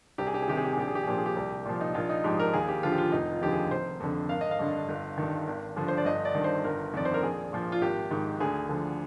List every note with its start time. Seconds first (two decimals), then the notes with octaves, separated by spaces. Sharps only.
0.18 C2 G4
0.27 G#4
0.34 G4
0.42 G#4
0.48 C3 D#3 G4
0.57 G#4
0.64 G4
0.72 G#4
0.77 A#1 G4
0.88 G#4
0.95 G4
1.03 G#4
1.07 A#2 F3 G4
1.18 G#4
1.26 G4
1.36 C2
1.65 A#2 F3
1.81 D#4
1.94 A#1 F4
2.09 D#4
2.24 G#2 F3 G4
2.40 A#4
2.54 D#2 G#4
2.68 G4
2.83 D3 F3 F4
2.92 G4
2.98 F4
3.12 F1 D#4
3.32 F4
3.41 D#2 D3 F3 G4
3.51 G#4
3.71 F1 C5
4.00 F2 D3
4.29 G#1 F5
4.41 D#5
4.51 F5
4.59 G2 D3
4.89 G1
5.18 G2 D#3
5.47 G#1
5.76 G2 D3 F3
5.88 C5
5.97 D5
6.05 G1 D#5
6.25 D5
6.35 G2 D#3
6.44 C5
6.64 G1 A#4
6.94 F2 D#3 D5
7.05 C5
7.14 A#4
7.23 A#1 G#4
7.53 A#2 F3
7.72 F4
7.82 G#1 G4
8.10 G#2 D#3
8.40 D2 G#4
8.69 D3 F3